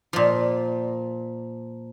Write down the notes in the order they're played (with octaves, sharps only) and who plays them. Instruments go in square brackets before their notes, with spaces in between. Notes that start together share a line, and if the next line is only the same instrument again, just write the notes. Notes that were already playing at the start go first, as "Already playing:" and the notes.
[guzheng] A#2 F3